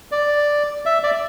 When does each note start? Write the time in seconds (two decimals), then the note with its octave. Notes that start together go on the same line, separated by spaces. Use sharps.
0.12 D5
0.86 E5
1.03 D5